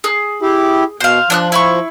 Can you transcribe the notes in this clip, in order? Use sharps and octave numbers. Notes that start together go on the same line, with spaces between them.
G#4
E4 G4
B2 C5 F5
F3 D4 D#6 F#6
E4 B5 C#6